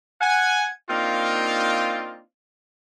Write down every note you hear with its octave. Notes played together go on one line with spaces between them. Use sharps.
F#5 G#5
A#3 C4 D4 D#4 F4